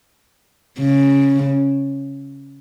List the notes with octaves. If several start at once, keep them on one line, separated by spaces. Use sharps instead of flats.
C#3